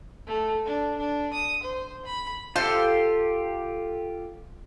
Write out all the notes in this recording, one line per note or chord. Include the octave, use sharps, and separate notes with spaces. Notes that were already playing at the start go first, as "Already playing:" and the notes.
A3
D4
D4
D#6
C5
B5
F4 G4 A4 C5 F5